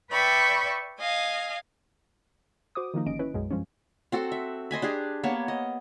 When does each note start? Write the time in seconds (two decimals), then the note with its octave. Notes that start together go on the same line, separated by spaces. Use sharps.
0.11 B4 D5 E5 G5 B5 C#6
0.99 D#5 F5 G#5
2.75 F#4 C5 D6 D#6
2.94 D#3 F3 A#3 D#4
3.06 G1 C#4 D#5 D7
3.19 C#4 E4 B4
3.34 B1 F#2 G#3
3.51 G2 F3 G#3 C#4
4.12 C4 F#4 A4 F#5
4.32 E5
4.71 C5 D#5 G#5 B5
4.82 D4 G4 G#4
5.23 A#3 B3 C#5 A5
5.48 D#5